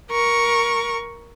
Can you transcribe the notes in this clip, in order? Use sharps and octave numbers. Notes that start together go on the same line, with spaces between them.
A#4 C#6